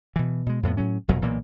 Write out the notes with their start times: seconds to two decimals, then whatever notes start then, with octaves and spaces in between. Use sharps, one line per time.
0.16 B2 E3
0.46 B2 G#3
0.63 F2 A2 G3 B3
0.77 A2 F#3 C#4
1.08 F1 F2 B2 F#3
1.22 B1 A#2 E3 A#3